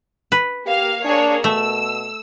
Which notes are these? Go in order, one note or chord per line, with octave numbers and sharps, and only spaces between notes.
B4
A#3 G4 F5
A#3 D4 G#4 C#5
B2 A3 E6